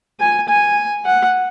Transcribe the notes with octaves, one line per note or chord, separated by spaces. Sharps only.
G#5
G#5
F#5